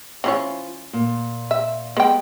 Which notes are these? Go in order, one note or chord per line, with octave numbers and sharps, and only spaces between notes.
E3 C#4 F4 C5 C#5
A#2
E5
G3 G#3 B3 G5